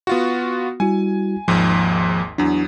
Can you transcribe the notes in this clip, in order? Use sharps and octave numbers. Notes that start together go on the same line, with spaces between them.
B3 F4 F#4
G3 E4 F#4 G#5
G#1 D#2 G#2 F3
E2 F#3 D4 E4